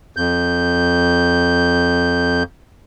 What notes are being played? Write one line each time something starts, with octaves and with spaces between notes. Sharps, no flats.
F2 G6